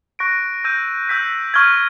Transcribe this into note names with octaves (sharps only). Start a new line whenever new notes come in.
C#6 F#6 A#6 D7
E6 G6 A#6 D#7
E6 G6 B6
C#6 F6 G#6